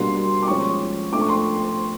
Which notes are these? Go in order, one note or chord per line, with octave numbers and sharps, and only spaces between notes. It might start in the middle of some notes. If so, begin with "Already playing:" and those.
Already playing: B2 G3 A#3 D4 C6
D6
F3 G#3 C#4 C#6
F3 A3 D4 D6
C#6
C6